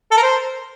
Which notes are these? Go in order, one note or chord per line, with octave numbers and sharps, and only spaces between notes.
A4
A#4
C5